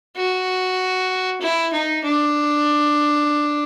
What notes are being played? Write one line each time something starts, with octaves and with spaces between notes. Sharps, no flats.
F#4
E4
D#4
D4